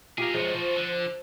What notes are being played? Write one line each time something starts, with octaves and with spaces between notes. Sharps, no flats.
F4 G4 G#4 A#4
F#2 F3 G#3 F4 F#4
F3
D3